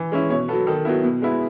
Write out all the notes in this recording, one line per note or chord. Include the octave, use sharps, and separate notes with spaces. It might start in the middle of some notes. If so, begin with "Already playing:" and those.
Already playing: E3
G#3 C#4 E4
B2 C#5
B3 A4
F#3
D#3 A4
F#3 B3 E4
B2
G#3 B3 E4